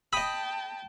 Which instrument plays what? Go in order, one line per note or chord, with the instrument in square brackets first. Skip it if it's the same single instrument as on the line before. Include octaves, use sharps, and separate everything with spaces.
[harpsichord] D#5 B5 [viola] G5 A5 [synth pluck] D#6